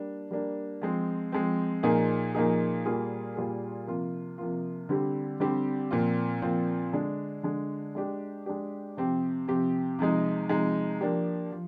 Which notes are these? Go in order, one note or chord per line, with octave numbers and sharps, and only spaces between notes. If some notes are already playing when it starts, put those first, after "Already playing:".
Already playing: G3 A#3 D4
G3 A#3 D4
F3 G#3 C4
F3 G#3 C4
A#2 F3 A#3 D#4 G#4
A#2 F3 A#3 D#4 G#4
A#2 G3 A#3 F4 G#4
A#2 G3 A#3 F4 G#4
C3 F3 A#3 F4
C3 F3 A#3 F4
D3 G3 C4 G4
D3 G3 C4 G4
A#2 F3 C4 F4
A#2 F3 C4 F4
D3 G#3 D4
D3 G#3 D4
G#3 D4 G4
G#3 D4 G4
C3 F3 C4 G4
C3 F3 C4 G4
C3 F3 G#3 D#4
C3 F3 G#3 D#4
F3 A#3 D4 G4
F3